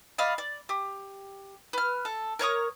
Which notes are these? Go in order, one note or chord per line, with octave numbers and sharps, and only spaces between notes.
D5 D#5 F5 B5
D5
G4
B4 F6
A4
A#4 C#5 C#6 D#6